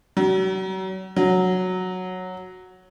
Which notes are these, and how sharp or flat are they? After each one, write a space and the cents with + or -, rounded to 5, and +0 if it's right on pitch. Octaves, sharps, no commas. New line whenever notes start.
F#3 +35
F#3 -5